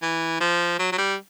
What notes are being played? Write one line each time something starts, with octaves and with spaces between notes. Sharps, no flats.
E3
F3
F#3
F#3
G3